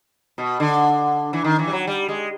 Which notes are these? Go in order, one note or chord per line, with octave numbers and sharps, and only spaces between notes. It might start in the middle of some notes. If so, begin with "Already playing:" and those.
B2
D3
E3
D#3
E3
G3
F#3
G3
G#3